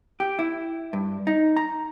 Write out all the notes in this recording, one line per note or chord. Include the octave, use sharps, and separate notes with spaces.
G4
E4
G2
D#4
A#5